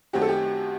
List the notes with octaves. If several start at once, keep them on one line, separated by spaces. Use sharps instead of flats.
F#2 D#3 A3 C4 F#4 G4
A4
G4